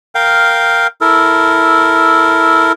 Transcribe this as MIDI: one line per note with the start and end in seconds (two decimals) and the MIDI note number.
0.15 0.87 70
0.15 0.87 77
0.15 0.87 79
1.01 2.72 64
1.01 2.72 69
1.01 2.72 70